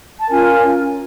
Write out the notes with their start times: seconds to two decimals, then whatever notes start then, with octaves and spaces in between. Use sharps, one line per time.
0.20 A5
0.29 C#4 F4 A#4 G#5